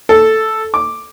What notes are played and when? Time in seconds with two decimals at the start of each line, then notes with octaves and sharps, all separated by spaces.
0.09 A4
0.74 D6